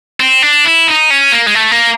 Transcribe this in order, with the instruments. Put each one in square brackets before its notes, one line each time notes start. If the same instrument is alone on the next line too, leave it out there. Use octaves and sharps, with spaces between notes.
[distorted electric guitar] C4
D4
E4
D#4
C#4
A#3
G#3
A3
A#3